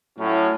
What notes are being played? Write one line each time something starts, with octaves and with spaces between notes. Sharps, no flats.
A2 F#3 C#4